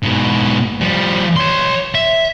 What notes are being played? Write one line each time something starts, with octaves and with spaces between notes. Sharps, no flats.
G#2 B2
F3 G3
C#5 C6
E5